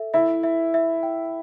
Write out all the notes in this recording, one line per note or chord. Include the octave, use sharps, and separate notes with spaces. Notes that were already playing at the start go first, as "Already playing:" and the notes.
Already playing: A4 E5
E4 E5
E5
E5
G5